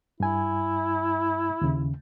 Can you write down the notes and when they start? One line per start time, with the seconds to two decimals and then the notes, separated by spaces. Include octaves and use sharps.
0.20 G2 E4 G#5
1.61 D#2 C#3